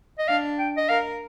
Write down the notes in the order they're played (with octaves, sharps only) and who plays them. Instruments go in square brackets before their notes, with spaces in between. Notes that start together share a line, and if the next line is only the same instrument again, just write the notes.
[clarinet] D#5
[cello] D4 [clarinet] F5
[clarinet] G5
D#5
[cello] A#4 [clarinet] F5